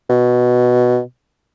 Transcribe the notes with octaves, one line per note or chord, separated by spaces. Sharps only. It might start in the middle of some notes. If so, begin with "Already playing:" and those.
B2